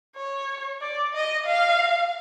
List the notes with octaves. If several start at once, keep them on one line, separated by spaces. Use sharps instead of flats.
C#5
D5
D#5
F5